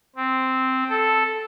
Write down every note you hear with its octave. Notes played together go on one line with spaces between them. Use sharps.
C4
A4